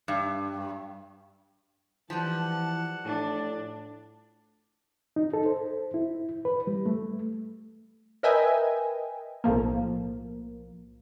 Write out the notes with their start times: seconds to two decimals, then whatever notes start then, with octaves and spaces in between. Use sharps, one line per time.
0.08 G2
2.10 E3 F3 G3 F#5 A5
3.05 A2 D4
5.16 D#4
5.33 A4
5.46 C5
5.94 E4
6.45 B4
6.67 G3
6.86 A3
8.23 A#4 B4 D#5 E5 G5 G#5
9.44 B1 A2 F3 A#3